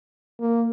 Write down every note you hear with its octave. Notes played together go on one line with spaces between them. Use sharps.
A#3